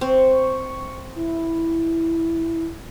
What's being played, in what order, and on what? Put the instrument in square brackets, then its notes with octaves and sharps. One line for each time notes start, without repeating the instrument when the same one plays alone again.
[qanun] C4 [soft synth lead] C#6
[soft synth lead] E4